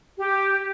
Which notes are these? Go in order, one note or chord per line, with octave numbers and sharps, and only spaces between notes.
G4